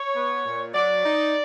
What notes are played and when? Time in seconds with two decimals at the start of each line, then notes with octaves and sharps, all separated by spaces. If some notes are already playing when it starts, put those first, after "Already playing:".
Already playing: C#5
0.14 B3
0.45 A#2
0.74 F#3 D5
1.03 D#4